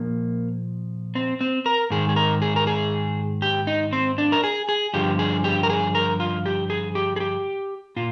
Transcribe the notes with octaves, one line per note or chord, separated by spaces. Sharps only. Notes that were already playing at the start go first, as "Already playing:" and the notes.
Already playing: A#2 F3 A#3
C4
C4
A#4
G#2 D#3 G#4
G#4
A#4
G#4
A#4
G#4
G4
D#4
C4
D4
A#4
G#4
G#4
G2 D3 F3 G4
G#4
G4
A#4
G#4
A#4
F4
G4
G#4
G4
G#4
G4
A#2 F4